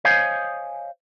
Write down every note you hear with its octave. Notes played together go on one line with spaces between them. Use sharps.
C5 C#5 D#5 F5 G#5